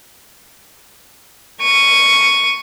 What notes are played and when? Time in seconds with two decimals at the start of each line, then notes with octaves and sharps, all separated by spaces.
1.62 C#6 D#7